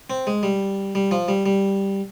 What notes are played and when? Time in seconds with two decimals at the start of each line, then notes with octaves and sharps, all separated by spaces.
0.10 C4
0.27 G#3
0.43 G3
0.95 G3
1.11 F3
1.28 G3
1.46 G3